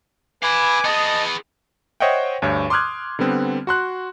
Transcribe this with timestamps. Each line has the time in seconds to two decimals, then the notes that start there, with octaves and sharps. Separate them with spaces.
0.43 B4 F5 G#5 B5 D6
0.85 B3 G#4 D#5 A5
2.00 C5 C#5 D#5 E5 F#5 G5
2.42 D2 G2 C#5
2.70 C6 D6 D#6 F6 F#6 G#6
3.19 D3 G3 B3 C4
3.67 F#4 C6 F#6